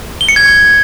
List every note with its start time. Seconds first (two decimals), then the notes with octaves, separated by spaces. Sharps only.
0.21 G7
0.29 C#7
0.36 G#6